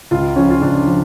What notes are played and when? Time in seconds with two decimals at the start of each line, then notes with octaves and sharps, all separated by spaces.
0.11 C#2 F4
0.36 C#3 F3 C#4
0.50 F4
0.61 C#2 D4
0.87 F3